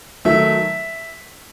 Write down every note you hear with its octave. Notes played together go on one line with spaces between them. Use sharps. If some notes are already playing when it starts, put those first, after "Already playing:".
D#3 F#3 A3 E5